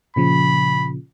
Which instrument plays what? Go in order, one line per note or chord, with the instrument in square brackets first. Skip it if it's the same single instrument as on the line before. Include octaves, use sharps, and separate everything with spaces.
[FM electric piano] A#2 C#3 F3 [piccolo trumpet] B5